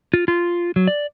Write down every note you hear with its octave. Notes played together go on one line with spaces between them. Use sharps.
F4
F4
F#3
D5